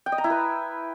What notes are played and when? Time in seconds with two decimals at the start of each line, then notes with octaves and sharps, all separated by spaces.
0.06 G5
0.12 D#5
0.18 A#5
0.24 E4
0.30 B4